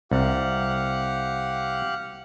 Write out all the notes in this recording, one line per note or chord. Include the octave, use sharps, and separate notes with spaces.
C2 G4 F5 F#5